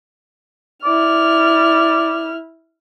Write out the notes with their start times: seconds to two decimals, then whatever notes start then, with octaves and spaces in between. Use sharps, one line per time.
0.85 E4 D5 F6